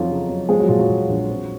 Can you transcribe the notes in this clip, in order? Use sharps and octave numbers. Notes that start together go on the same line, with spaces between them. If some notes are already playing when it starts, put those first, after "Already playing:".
Already playing: F2 F#3 D#4 F4
C#3
F#3
F3 G#3 G#4
F#3 F#4
A#2 F4
F#3 F#4
A#2
A#1
C4